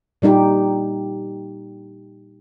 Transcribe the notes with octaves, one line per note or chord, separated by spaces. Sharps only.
A#2 G3 D#4 G4